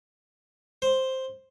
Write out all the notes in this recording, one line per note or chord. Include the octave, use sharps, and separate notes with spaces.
C5